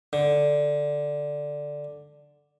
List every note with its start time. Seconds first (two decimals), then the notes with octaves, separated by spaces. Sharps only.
0.13 D3